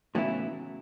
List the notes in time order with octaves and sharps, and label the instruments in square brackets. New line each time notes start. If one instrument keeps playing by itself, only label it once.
[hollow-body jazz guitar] A2 E3 B3 E4 [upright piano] C#3 F#3